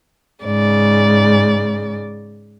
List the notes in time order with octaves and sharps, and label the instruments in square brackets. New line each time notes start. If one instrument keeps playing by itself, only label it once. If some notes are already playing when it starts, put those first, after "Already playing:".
[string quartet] G#2 C#3 D5